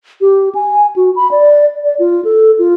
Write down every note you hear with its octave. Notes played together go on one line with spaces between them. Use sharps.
G4
G#5
F#4
B5
D5
D5
F4
A4
F4